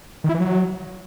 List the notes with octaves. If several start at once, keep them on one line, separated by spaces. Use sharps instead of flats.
D#3
E4
E3
F#3